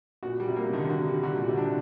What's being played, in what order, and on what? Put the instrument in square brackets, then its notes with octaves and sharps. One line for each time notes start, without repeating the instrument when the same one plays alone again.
[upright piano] A#2 [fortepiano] F#4
[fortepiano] G3
[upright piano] C3
[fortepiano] A#3
[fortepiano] D3 [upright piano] D#3
[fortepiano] F#4
G3
[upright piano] D3 [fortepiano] F#4
[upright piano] A#2 [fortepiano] G3
[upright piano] C3
[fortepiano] D4